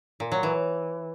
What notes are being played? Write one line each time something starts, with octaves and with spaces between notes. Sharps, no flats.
A#2
F#3
E3